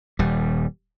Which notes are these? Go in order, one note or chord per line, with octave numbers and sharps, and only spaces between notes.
D#1 G3